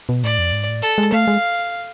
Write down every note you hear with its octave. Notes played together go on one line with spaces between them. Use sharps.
B2
A2 D5
F2
G#2
A2
A4
G#3
A3 F5
G#3